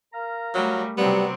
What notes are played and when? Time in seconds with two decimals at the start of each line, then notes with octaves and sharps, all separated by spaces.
0.13 A#4 F5 A#5
0.54 F#3 G3 A3
0.97 C3 F#3 G3 B3 C4